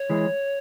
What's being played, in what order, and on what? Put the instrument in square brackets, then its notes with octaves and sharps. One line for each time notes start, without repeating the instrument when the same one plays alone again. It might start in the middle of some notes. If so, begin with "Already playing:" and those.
Already playing: [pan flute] C#5
[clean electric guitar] E3 G#3